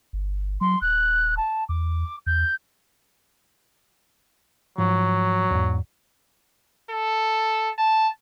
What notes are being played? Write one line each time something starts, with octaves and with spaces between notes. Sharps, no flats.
G1
F#3 C6
D#1 F#6
A5
E2 D6
E2 G6
G#2 F3 F#3
E2 G#2
A4
A5